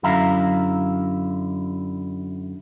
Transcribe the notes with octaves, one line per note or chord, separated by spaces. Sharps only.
F#2 D3 E4 E5 F5 A#5